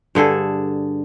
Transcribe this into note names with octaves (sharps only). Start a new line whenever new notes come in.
G2 D3 G#4 A4